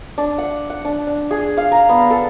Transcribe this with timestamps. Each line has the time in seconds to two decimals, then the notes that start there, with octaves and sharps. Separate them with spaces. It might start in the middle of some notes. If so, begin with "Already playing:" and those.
0.18 D4
0.38 F#5
0.70 F#5
0.85 D4
1.07 D4
1.31 G#4
1.58 F5
1.72 A#5
1.89 B3
2.11 A4